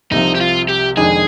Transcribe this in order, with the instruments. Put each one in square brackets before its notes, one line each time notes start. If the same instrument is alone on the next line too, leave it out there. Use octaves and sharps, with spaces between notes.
[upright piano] C2 C3 F3 [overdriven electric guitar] D#4
[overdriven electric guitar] G4
F4
G4
[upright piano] F2 D#3 G#3 D4 [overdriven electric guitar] G#4